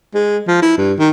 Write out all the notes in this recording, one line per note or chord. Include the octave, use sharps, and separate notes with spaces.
G#3
F3
E4
G2
D#3